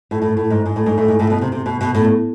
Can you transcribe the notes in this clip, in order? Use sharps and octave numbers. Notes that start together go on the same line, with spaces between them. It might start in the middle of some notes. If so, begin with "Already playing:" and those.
A2
A2
A2
G#2
G#2
A2
G#2
A2
G#2
A2
B2
C3
C3
B2
B2
A2